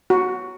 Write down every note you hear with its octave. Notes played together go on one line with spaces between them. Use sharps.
F#4